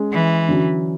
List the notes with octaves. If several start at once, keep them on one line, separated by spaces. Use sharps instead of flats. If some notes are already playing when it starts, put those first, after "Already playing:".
Already playing: G#3 C#4 G#4
E3
D3 F#3 C#4